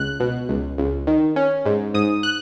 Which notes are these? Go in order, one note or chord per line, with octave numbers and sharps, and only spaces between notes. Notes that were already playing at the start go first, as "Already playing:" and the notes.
Already playing: C#2 F#6
B2
C#2
C#2
D#3
C#4
G#2
G#2 D#6
F#6